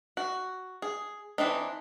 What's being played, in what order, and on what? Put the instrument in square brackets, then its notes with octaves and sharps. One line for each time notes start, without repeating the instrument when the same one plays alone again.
[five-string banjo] F#4
G#4
E3 C4 D4 D#4